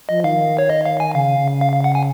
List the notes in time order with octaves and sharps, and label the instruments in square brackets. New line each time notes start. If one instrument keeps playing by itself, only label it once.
[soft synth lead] F3 [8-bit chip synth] D#5
[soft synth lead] D#3 [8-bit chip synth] F5
[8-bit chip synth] C#5
D#5
F5
G#5
[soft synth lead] C#3 [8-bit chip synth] F5
[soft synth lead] C#3
[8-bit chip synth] F5
F5
F#5
G#5